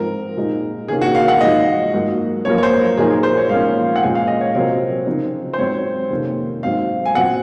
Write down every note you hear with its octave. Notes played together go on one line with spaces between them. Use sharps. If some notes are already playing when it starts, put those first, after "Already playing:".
Already playing: G#2 F3 C4 D#4 A#4
A#2 G#3 D#4
C3 D#3 A#3 C#4 G#4
F#4
F5
F#5
G#2 F3 G#3 D#4 D#5
G#2 F#3 A#3
F#2 F3 A#3 C#5
C#5
C5
A#4
A#2 F3 A#3 D#4 G#4
A#4
C5
C#5
G#2 F3 A#3 C#4 F5
F#5
A#2 G#3 C#4 G#5
F5
D#5
C#5
C3 F#3 C4 A#4
C#3 F3 C4 D#4
C5
G#2 F#3 C4 D#4 C#5
F2 C3 D#3 A#3 C#4
G#2 F#3 C4 D#4 F5
G#5
A#2 F#3 C4 F#5